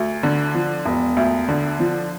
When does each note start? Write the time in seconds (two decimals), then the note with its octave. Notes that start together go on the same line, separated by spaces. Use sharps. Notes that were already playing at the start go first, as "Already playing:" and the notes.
Already playing: D2
0.23 D3
0.54 F3
0.85 E1
1.17 D2
1.48 D3
1.79 F3